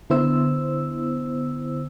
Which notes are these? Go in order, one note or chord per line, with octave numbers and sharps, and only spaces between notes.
D3 B3 E4 C5 E6